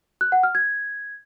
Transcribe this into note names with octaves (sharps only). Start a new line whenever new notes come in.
F#6
F#5
F6
G#6